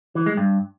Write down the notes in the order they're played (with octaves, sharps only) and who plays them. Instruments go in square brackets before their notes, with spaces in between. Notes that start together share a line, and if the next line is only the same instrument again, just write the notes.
[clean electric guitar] E3
G#3
G2